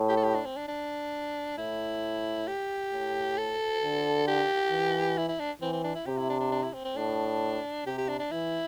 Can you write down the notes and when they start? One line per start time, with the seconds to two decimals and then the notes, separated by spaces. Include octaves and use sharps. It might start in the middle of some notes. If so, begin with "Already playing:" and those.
Already playing: A2
0.09 G4
0.17 A4
0.23 G4
0.35 D4
0.46 C4
0.57 D4
0.68 D4
1.58 A2 E4
2.48 G4
2.93 A2
3.38 A4
3.82 D3
4.27 G4
4.72 E3
5.18 E4
5.29 E4
5.39 D4
5.62 E3 C4
5.72 C4
5.84 D4
5.95 E4
6.06 C3 G4
6.18 E4
6.29 D4
6.40 D4
6.52 D4
6.63 E4
6.74 C4
6.85 C4
6.96 A2 D4
7.86 C3 G4
7.98 G4
8.08 D4
8.20 D4
8.31 E3 E4